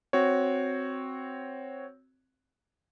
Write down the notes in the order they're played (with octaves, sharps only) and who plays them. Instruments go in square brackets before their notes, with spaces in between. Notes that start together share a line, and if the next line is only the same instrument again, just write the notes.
[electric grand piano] C4 F#4 C#5